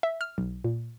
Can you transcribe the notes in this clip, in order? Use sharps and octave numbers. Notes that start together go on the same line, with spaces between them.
E5
F6
B1
A#2